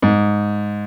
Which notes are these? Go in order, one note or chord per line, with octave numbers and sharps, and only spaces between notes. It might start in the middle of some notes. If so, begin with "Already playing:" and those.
G#2